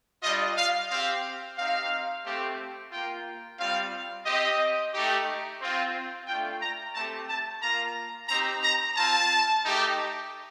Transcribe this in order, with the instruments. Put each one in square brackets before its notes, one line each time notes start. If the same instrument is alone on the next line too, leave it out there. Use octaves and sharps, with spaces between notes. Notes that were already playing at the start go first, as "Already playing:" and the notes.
[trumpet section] G3 D4 F4 D#5
F5
C4 G4 F5
C4 D#4 G4 F5
A3 C4 G4
A#3 F4 G5
G3 C4 F4 F5
C4 G4 D#5
A3 D#4 G4
C4 F4
A3 D4 F4 G5
A#5
A3 C4 G4 A5
A5
A#3 F4 A#5
C4 D#4 G4 A#5
A#5
C4 F4 A5
A3 D#4 G4